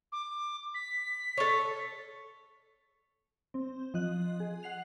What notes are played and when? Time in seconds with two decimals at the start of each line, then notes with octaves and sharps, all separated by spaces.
0.12 D6
0.75 B6
1.37 A4 C#5
3.54 C4
3.94 F3 D#5 F#6
4.40 G#4
4.63 F#5 C7 F7